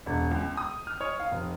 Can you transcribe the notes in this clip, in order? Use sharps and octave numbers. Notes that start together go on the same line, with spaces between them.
E1
C#2
D#6
F6
C#5
F5
F1